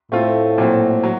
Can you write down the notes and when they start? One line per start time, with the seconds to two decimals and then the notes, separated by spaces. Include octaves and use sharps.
0.12 A2 A3 C4 F4
0.58 A#2 F#3 C4
1.04 F#3